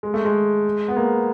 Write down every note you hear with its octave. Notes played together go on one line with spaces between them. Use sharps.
G#3
A3
G#3
B3
A#3